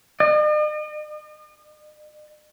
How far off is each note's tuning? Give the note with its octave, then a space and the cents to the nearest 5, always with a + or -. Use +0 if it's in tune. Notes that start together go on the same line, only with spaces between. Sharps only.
D#5 -45